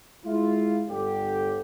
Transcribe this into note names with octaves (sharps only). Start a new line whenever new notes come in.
G#3 E4 F4
G1 D3 G4